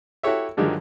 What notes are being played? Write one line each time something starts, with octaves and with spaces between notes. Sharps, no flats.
E4 F#4 G4 A4 C#5 E5
G2 D3 D#3 F3 F#3 G#3